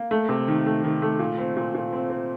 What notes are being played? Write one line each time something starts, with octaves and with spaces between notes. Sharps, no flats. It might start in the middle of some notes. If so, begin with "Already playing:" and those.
Already playing: A#3
A3
C3
D#3
A3
D#3
A3
A#2
C4
A#2
A#2
C4
C4